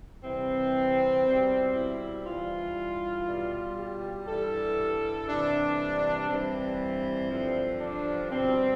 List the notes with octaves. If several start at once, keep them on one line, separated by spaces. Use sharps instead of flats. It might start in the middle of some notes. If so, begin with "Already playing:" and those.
C3 E3 G3 C4
B2 G3
E4
G2 E3 G3 F4
B2 G3
G4
G2 E3 G3 A4
C3 E3 G3 D4
G2 E3 G3 C4
G2 D3 F3
D4
B2 G3 C4